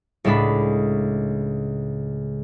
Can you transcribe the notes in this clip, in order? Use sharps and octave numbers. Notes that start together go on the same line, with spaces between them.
C#2 A2 G#3 D4 B5